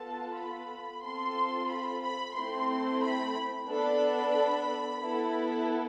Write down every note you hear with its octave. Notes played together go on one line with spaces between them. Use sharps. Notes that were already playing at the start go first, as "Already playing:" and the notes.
Already playing: B3 F4 A4 A5
B5
C4 F4 A4 C6
B5
B5
A3 C4 E4 C6
B5
B3 D4 A4 B5
B3 E4 A4